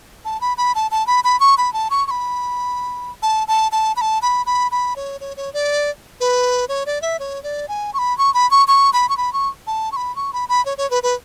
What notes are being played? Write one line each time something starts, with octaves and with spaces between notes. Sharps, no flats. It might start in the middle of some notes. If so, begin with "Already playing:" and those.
A5
B5
B5
A5
A5
B5
B5
C#6
B5
A5
C#6
C#6
B5
A5
A5
A5
B5
A5
B5
B5
B5
C#5
C#5
C#5
D5
B4
C#5
D5
E5
C#5
D5
G#5
C#6
B5
C#6
B5
C#6
C#6
B5
C#6
B5
C#6
A5
C#6
B5
C#6
B5
B5
C#5
C#5
B4
B4